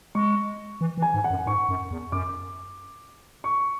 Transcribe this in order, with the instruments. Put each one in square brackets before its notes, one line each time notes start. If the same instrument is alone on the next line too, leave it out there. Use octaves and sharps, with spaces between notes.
[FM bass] G#3 [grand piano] C#6
[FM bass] E3
E3
[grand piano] G#5
[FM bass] G#2
[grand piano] F#5
[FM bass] F#2
[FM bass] G#2 [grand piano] C#6
[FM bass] F#2
E2
[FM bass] F#2 [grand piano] D6
[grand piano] C#6